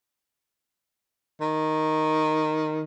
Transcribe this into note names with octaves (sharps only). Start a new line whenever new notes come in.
D#3